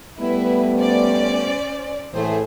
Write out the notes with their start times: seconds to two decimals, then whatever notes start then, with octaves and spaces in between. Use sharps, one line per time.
0.19 G3 A3 B3 E4 B4
0.78 C#4 C5 D5
2.12 A2 E3 A3 G#4 C5